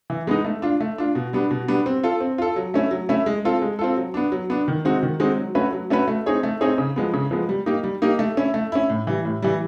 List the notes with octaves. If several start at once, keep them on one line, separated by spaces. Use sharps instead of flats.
E3
G#3 B3 D#4
A3
D4 F4
A3
D4 F4
B2
G3 B3 D4
B2
G3 B3 D4
C4
F4 A4
C4
F4 A4
F#3
A3 C#4 E4
F#3
A3 C#4 E4
G#3
C4 F4 A4
G#3
C4 F4 A4
F#3
B3 D4
F#3
B3 D4
D#3
G#3 C4 D#4 F#4
D#3
G#3 C4 D#4 F#4
F#3
A3 C#4 F#4 B4
F#3
A3 C#4 F#4 B4
A3
C4 D#4 G#4 C#5
A3
C4 D#4 G#4 C#5
C#3
F3 G#3 B3
C#3
F3 G#3 B3
G3
A#3 D#4 G4
G3
A#3 D#4 G4
A3
C#4 E4
A3
C#4 E4
A2
E3 G3
A2
E3 G3